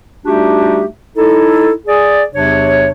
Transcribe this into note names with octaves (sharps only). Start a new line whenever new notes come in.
G3 A3 D4 D#4 F#4 G4
D#4 E4 A4
G#4 D5
E2 C3 F#3 D4 C#5